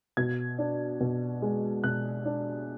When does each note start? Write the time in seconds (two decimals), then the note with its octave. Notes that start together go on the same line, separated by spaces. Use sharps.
0.17 B2 G#6
0.59 D4
1.01 B2
1.42 G#3
1.84 B2 F#6
2.25 D4